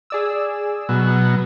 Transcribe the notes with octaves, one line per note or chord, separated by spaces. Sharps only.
G#4 D5 E6
B2 F#3